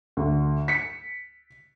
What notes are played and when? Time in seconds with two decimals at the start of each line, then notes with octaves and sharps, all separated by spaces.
0.17 D2
0.68 B6 C#7